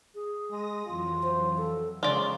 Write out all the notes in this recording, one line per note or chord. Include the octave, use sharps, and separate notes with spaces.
G#4
G#3 D#6 A#6
F2 E3 F#3 F4
C5
A4
C#3 F3 G#3 F4 A#4 C5 D5